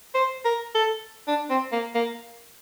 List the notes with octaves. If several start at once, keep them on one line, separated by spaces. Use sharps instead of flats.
C5
A#4
A4
D4
C4
A#3
A#3